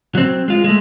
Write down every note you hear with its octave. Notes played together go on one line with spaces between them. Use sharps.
F#3 C4
G#3 F4
G#3 A3